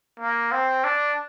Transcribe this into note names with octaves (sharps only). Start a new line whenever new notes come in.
A#3
C4
D4